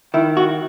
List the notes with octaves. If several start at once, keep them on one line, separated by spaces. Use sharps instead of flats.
D#3 E4
F#4